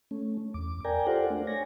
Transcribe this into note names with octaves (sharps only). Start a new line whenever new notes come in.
A3 C#4
E2 D6
A#4 D5 G5 G#5 A#5
F4 G4 A4 C5 D5 F#5
A3 D4
C#5 G#5 A#6